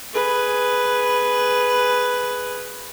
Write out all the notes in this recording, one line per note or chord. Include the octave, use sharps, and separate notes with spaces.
G#4 B4